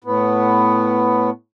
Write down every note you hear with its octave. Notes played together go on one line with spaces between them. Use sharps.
A2 B3